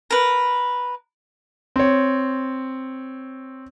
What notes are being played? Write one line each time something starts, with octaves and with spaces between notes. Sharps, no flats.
A#4 B4
C4 C#5